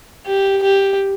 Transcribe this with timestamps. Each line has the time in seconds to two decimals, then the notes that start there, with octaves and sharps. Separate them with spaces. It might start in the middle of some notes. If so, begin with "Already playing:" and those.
0.26 G4
0.63 G4